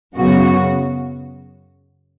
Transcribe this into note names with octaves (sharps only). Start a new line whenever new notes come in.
F#2 C#3 F#3 B3 F#4